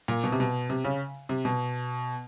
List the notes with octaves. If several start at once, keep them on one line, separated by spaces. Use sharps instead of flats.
A#2
B2
C3
B2
C3
C#3
C3
B2